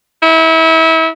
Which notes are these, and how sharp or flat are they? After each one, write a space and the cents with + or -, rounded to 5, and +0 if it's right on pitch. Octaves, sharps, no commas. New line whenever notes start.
E4 -30